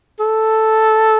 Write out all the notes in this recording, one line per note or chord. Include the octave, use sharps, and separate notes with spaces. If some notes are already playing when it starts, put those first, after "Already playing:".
A4